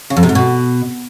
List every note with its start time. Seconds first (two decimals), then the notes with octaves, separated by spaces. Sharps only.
0.10 C#3
0.17 F2
0.23 C3
0.29 G#2
0.35 B2